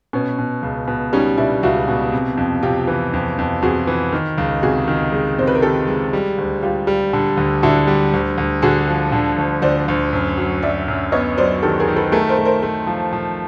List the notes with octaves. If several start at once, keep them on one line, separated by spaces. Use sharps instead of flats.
B2 B3 C#4
B2
C#2
B2
G3 C#4 D#4
B2 D4 E4
C#2 E4 F#4
B2
C3
F2
C3 F4 G4
E3
F2
F2
F2 F#4 G#4
E3
D#3
C#2
C3 F#4 G#4
D#3
G#3
C3 C5
B4
A#4
D#3 G4 A4
G#3
G3
D2
G3 F4 G4
G3
D3
D2
D3 E4 F#4
G3
D2
D2
D3 F#4 G#4
F3
D3
D2
D2 C5 D5
D2
F#2
F#3
F#3 D5 E5
F#2
B3 C#5 D#5
F#3 C5 D5
D#3 G4 A4
G#4 A#4
D#3
A4 B4
A3 G#4 A#4
A#4 C5
A3
A#4 C5
A3
F3
F3